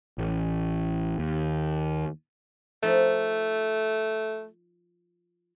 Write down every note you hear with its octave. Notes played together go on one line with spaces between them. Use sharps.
A1
D#2
F3 A3 D#4